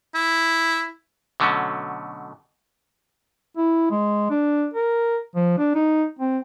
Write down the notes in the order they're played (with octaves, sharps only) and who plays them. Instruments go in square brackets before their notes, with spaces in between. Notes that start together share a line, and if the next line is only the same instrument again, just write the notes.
[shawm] E4
[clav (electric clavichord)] B2 D3 F#3 A3 C#4
[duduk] E4
G#3
D4
A#4
F3
D4
D#4
C4